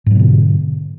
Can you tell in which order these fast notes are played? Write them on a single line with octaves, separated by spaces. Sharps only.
G#2 F#3 B2 D3